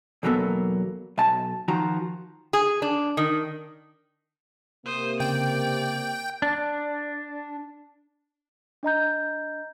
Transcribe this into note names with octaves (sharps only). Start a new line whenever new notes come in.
B1 E2 F#3 A#3 B3 A4
B1 A5
D#3 F3 F#4 A#5
G#4
D4
D#3
C3 A#3 C5 D#6
C#3 D5 G5
D4
D4 D#5 A#5 G6